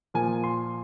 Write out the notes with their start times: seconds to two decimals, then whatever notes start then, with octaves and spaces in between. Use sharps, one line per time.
0.14 A#2 F3 A#3 G#5
0.44 C6